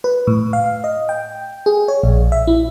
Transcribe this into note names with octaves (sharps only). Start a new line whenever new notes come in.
B4
A2
F5
D#5
G5
G#4
C#5
A#1
E5
E4